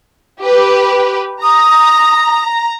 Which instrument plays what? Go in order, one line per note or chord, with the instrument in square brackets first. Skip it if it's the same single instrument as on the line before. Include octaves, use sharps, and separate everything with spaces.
[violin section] G4 B4
[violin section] A#5 [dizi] D#6